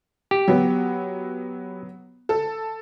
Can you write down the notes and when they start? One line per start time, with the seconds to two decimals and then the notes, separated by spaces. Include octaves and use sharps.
0.31 G4
0.48 F#3 B3
2.29 A4